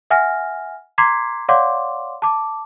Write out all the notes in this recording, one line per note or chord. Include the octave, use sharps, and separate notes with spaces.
E5 F#5 G#5 F6 A#6
A#5 C6 D6 G#6 B6 C7
C#5 D5 F5 F#5 C6 D6
A5 D6